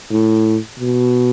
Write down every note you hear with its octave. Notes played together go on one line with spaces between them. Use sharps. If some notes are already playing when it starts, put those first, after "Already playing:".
A2
B2